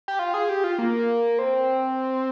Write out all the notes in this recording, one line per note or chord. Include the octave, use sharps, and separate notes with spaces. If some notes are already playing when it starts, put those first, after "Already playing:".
G4
F4
G#4
G4
F4
A#3
C4